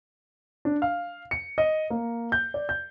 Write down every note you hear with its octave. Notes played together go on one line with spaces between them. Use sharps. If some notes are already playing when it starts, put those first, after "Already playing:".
D4
F5
C#7
D#5
A#3
G6
D5
G6